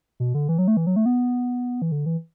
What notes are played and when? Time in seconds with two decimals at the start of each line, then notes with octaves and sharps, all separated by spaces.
0.20 B2
0.34 D3
0.49 E3
0.58 F#3
0.68 A3
0.77 E3
0.87 F#3
0.96 A3
1.06 B3
1.82 E3
1.92 D3
2.06 E3